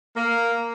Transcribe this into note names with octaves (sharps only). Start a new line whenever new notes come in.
A#3